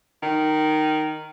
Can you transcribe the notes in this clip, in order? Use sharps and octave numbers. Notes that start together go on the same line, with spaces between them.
D#3